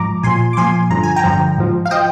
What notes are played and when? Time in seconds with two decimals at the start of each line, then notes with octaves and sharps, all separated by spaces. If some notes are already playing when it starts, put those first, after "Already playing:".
Already playing: G#2 F3 A#5 D6
0.23 A#2 F3 G#5 C6
0.53 D6
0.57 A#2 F3 G#5 C6
0.90 G2 D3 F3 A#5
1.03 G#5
1.16 G5 A#5
1.24 G2 D3 F3
1.58 G#2 F3
1.86 F5
1.91 F3 D#5 G5